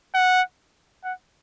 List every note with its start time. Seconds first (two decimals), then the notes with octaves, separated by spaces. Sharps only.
0.15 F#5
1.04 F#5